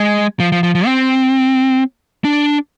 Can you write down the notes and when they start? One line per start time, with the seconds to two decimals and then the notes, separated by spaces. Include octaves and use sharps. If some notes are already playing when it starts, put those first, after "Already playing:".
Already playing: G#3
0.40 F3
0.52 F3
0.63 F3
0.75 F3
0.86 C4
2.25 D4